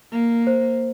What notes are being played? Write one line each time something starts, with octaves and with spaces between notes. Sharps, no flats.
A#3
C5